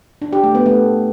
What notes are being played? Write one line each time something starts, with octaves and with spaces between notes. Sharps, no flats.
D4
G4
A3
B3
A3